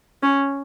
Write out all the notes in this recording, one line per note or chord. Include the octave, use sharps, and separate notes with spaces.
C#4